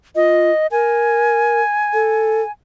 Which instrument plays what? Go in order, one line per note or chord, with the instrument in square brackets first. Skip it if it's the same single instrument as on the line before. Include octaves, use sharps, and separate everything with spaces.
[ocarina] F4 [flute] D#5
[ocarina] A#4 [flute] G#5
[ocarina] A4